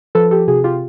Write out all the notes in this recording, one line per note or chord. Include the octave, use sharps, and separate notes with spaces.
F3 A4 B4
G4 A4
C3 F#4 G#4
F4 G4